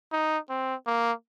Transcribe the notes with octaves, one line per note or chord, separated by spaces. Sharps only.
D#4
C4
A#3